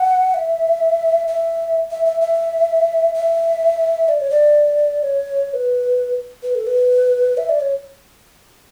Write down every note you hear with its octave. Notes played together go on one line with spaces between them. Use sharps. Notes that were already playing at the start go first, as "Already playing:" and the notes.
Already playing: F#5
E5
E5
E5
E5
E5
E5
D5
C#5
D5
C#5
C#5
B4
B4
A4
B4
E5
D5
C#5